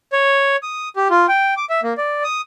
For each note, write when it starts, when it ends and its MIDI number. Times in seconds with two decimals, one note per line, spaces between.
0.13 0.56 73
0.63 0.89 87
0.96 1.08 67
1.10 1.26 65
1.28 1.54 79
1.57 1.65 86
1.70 1.80 76
1.83 1.93 58
1.98 2.23 74
2.24 2.41 87